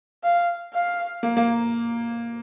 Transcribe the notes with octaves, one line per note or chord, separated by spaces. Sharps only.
F5
F5
A#3
A#3